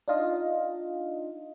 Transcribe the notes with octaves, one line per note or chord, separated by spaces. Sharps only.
D4 D#4 F4 D#5